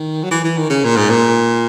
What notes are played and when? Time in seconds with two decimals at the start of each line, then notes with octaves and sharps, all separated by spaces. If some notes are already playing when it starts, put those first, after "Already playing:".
Already playing: D#3
0.23 F#3
0.31 E3
0.44 E3
0.58 D#3
0.70 C#3
0.84 A#2
0.97 G#2
1.10 A#2